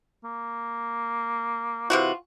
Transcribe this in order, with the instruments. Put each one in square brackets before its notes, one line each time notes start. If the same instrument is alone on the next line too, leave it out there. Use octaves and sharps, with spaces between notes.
[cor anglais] A#3
[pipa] C3 E3 F#4 [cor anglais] F4